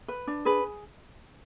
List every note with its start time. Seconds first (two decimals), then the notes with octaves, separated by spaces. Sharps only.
0.08 B4
0.27 D4
0.45 G#4 B4